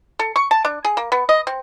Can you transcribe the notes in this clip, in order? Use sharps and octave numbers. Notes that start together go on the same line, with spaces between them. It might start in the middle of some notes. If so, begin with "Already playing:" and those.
A4
C#6
A5
D4
G#4
A#3
B3
D#5
C4